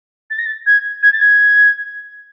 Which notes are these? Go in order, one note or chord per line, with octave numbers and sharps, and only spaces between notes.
A6
A#6
A6
G#6
G#6
A6
G#6